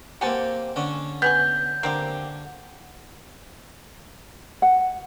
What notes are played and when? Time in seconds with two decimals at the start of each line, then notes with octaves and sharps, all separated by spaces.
0.21 A#3 C4 G4 F#5 G#5 A5
0.76 D3 C#4 D4
1.22 B3 G#4 G#5 G6
1.83 D3 A#3 C4 G4
4.62 F#5